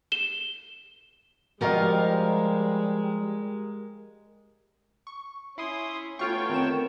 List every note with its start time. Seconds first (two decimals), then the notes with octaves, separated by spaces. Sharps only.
0.12 E7 G7
1.61 F3 G3 G#3 F#4 G4 A#4 D#5 F5
5.07 C#6
5.58 C#4 E4 C6 D#6
6.19 A3 B3 F4 C#5 G5 C#6
6.50 D#3 C4 A#4 E7